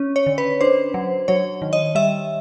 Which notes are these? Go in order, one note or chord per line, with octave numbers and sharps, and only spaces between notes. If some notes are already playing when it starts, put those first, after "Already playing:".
Already playing: C#4
C#5
D3
B4
D4 C5
F#3
F#3 C#5
D#3
D#5
G3 E5